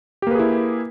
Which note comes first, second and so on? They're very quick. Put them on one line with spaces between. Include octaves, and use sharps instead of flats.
G4 A#3 B4 G#4 E4